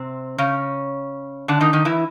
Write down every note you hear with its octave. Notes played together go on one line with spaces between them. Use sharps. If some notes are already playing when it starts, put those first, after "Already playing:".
Already playing: C3 C4
C#3 C#4
D3 D4
D#3 D#4
D#3 D#4
E3 E4